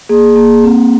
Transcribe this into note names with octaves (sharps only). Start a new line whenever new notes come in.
A#3 G#4
A#3
C4